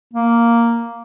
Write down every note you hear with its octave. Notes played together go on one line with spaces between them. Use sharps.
A#3